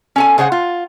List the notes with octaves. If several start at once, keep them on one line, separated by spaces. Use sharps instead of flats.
C#4 A4 G#5
C#3 G#4 C5 F#5
F4